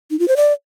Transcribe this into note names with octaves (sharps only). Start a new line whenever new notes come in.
D#4
F4
C5
D5